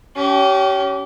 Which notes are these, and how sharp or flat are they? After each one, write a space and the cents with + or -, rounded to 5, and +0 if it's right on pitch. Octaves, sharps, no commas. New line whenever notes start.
C#4 +20 G4 -30